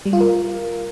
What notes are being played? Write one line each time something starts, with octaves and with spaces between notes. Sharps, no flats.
G3
F4
A#4